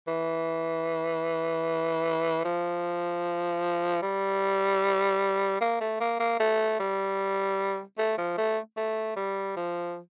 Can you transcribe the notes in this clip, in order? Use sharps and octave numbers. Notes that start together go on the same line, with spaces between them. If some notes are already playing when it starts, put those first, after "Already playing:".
E3
F3
G3
A#3
A3
A#3
A#3
A3
G3
A3
F3
A3
A3
G3
F3